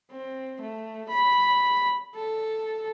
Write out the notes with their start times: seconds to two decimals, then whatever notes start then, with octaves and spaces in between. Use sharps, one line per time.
0.11 C4
0.61 A3
1.09 B5
2.15 A4